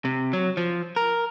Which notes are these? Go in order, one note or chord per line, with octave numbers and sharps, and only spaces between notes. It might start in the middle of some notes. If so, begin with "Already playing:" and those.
C3
F#3
F3
A#4